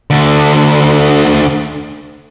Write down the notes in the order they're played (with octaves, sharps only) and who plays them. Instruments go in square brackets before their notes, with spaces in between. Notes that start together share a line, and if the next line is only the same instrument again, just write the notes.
[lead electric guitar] D2 D3